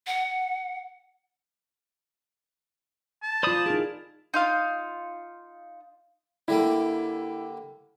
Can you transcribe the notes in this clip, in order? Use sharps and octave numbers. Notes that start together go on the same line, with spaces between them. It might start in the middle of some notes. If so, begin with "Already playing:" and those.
F#5
A5
F4 C5 D5 B5 D#6
D#4 E4 G#4 A#4
D#4 F4 F5
D3 G3 A#3 E4